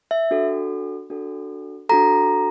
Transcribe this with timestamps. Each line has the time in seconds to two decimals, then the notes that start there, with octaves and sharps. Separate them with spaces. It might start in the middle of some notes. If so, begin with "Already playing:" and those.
0.11 E5
0.31 D4 F#4 A4
1.10 D4 F#4 A4
1.89 D4 F#4 A4 A#5